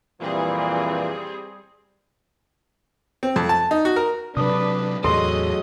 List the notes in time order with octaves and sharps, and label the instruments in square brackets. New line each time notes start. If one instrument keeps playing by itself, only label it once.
[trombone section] F2 A#2 E3 [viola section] G3 C4 G#4
[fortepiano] C4
F2
A5
D#4
F#4
A#4
[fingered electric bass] C3 F#3 [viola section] D4 B4 [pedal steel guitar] D#6
[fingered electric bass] E2 A2 [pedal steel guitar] F#3 A4 [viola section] G#4 D#5 [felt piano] C6